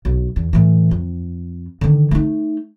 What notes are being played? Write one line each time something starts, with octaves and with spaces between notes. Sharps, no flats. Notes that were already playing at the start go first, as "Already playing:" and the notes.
B1
E2
A2 E3
F2
D3 D#3
A3 D#4